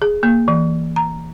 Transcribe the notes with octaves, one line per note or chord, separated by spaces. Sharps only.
G#4
A#3
E3
A#5